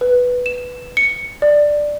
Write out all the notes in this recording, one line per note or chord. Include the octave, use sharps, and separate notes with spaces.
B4
E7
C#7
D5